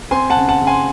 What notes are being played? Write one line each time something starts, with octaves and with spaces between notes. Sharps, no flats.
C4 G#5 C6
F#5 A5
C#3
F#5 A5
C#3
G#5 C6